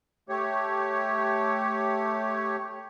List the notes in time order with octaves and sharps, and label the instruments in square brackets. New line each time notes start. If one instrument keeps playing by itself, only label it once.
[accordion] A3 G4 C#5